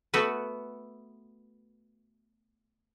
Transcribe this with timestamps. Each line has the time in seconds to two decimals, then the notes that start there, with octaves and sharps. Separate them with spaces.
0.14 A3 B3 F#4 B4